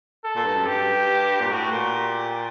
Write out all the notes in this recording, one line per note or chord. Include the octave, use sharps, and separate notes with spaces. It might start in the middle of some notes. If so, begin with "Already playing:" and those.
A4
A#2
G2
F#2
G2 G4
A#2
A2 F#4
A#2
G4